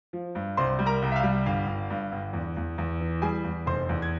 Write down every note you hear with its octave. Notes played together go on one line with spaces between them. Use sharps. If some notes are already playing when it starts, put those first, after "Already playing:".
F3
G2
C2 C5 C6
G3
A#4 A#5
C2
E5
F5
G3
G1 F5
G1
G2
G1
E2
E2
E2
E3
G3 G#4 G#5
E2
F1 C5 C6
E2
G#6